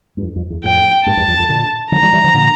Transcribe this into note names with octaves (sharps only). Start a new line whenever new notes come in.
G2
F2
F2
E2
F2 A2 G5
G2 A#2 A5
E2 G2
F2
F2
A#2 D3
D3 F3 A#5
E3 G3
E3 G3
D3 F3
A#2 D3